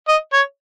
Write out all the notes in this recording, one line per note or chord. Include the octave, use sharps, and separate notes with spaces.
D#5
C#5